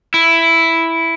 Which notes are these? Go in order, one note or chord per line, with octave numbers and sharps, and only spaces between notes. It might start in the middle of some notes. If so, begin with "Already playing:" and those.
E4